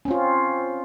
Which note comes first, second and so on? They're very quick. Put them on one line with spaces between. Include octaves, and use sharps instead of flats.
C#4 C4 F4